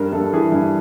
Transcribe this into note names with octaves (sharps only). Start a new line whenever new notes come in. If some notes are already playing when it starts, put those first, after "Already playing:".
Already playing: G2 A#4
G2 A4
E3 G#4
G2